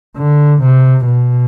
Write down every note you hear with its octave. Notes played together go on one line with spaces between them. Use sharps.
D3
C3
B2